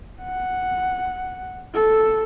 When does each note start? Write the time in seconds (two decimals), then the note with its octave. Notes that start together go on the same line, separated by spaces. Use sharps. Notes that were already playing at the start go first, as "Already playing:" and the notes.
0.22 F#5
1.74 A4